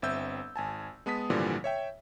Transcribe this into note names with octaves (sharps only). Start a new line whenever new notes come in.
G1 C4 E5 E6 G6
G#1 G#5 A5
G#3 B3 A5 D#6 B6
G#1 A#2 D3 E3 F3 G3
C#5 E5 G5